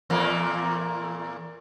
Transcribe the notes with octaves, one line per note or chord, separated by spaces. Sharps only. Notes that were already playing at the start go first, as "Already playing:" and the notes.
E2 A#2 A#3